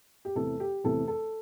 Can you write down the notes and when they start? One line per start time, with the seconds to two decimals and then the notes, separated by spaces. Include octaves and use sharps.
0.25 G4
0.35 E2 C3 E3 A3 C4 A4
0.60 G4
0.84 E2 C3 E3 A3 C4 A4
1.08 A4